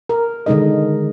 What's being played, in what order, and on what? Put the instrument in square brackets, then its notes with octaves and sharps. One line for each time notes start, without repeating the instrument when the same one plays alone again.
[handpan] A#4
D3 D#3 G#3 D#4 A#4 D#5